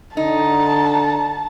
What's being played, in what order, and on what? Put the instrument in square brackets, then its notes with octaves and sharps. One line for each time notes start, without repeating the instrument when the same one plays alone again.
[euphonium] D3 [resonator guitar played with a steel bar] D#4 [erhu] A5